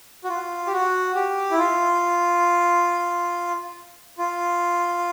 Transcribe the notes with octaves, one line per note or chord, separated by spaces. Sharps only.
F#4
F4
G4
F#4
G4
E4
F4
F4